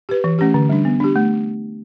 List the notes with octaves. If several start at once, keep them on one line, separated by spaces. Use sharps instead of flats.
G4 B4
E3
A3 C#4 G4
D3
G3 D4
B3
D4 G4
A3